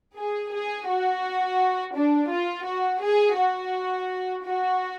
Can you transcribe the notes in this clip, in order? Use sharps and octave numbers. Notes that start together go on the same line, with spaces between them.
G#4
G#4
F#4
D4
F4
F#4
G#4
F#4
F#4